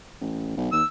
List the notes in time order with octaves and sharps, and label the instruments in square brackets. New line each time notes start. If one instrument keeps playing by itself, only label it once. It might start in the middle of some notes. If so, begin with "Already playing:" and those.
[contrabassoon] A1
B1
[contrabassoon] D#2 [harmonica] E6